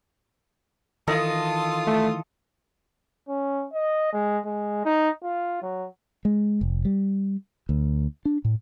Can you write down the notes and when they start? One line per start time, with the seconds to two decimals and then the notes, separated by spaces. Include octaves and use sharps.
1.08 D#3 E3 F4 A4 D#5 D#6
1.87 A3
3.29 C#4
3.73 D#5
4.13 G#3
4.45 G#3
4.85 D#4
5.23 F4
5.62 F#3
6.25 G#3
6.61 F1
6.85 G3
7.69 D2
8.25 D4
8.45 A2